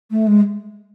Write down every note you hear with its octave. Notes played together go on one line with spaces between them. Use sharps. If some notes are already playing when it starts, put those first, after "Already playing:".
A3
G#3